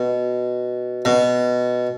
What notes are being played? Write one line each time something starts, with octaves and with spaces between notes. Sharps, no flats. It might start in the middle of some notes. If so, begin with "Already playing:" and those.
Already playing: B2
B2